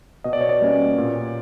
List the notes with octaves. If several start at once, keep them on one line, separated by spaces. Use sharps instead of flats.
B2 D#5
D5
C#5
D5
G3 A#3 C#4
A#2